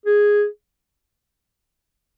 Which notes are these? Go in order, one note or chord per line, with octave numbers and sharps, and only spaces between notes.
G#4